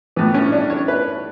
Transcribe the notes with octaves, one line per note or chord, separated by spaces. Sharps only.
A2 E3 B3
C#4
D4
C#5
B4